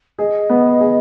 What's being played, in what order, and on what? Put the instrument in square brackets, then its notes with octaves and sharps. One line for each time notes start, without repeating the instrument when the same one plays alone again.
[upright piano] G#4 [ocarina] D#5
[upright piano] B3
G#4